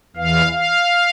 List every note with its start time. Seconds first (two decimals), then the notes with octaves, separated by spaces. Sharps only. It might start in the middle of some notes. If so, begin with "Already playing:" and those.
0.16 E2 E3 F5
0.53 F5